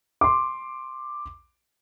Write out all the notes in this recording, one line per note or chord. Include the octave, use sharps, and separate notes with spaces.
C6 D6